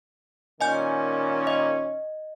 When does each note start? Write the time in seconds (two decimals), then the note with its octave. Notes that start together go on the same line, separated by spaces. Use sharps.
0.61 A#2 D#3 C#4 D#5 G#5 G6
1.47 D#5